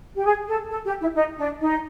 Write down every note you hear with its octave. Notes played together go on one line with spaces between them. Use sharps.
G4
G#4
A4
A4
G4
E4
D#4
D4
D#4